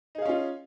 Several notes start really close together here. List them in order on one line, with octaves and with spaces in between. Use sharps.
D#4 G#4 F5 C#4 F4